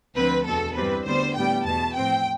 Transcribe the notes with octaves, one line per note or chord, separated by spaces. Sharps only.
D2 D3 F3 C4 B4
E2 B2 B3 A4
G2 E3 G3 C4 B4
D2 D3 G3 B3 C5
A2 G3 B3 G5
E2 B2 B3 A5
A2 F3 C4 G5